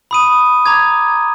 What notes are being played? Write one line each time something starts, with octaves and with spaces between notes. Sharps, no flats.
B5 D#6 D#7
A#5 D6 G#6